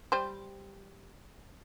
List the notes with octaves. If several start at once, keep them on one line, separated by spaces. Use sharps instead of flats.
G3 C5